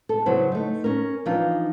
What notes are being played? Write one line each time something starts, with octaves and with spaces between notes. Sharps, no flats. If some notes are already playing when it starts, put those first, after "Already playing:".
A4
C#3 F#3 B3 E4 C5
A3 D#4
C#4 A#4
E3 F3 D4 D#4 F4